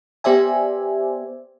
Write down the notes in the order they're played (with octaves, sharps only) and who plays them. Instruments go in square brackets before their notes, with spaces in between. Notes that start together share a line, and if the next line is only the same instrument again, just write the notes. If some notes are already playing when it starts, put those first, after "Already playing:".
[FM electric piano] B3 G4 C5 D5 E5 G#5